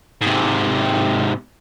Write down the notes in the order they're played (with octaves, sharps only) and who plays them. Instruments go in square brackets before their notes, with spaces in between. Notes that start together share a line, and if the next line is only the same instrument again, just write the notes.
[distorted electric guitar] G#2 C3